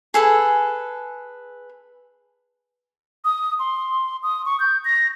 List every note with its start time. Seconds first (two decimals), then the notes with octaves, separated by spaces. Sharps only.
0.14 G#4 A4 B4 G#5
3.25 D#6
3.59 C6
4.23 D#6
4.46 C#6
4.60 G6
4.85 A#6